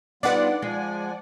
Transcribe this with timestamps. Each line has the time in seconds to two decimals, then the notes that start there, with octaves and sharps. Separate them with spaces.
0.23 G3 B3 D4 D#4 F4 B4 D5 F#5
0.62 F3 G#3 G#5